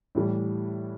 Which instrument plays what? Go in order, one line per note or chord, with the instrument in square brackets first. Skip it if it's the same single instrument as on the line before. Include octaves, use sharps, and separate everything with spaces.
[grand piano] A2 E3 G3